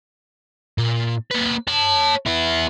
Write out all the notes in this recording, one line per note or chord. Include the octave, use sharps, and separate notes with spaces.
A#2
A#3 B4
C#5 A5
B3 E4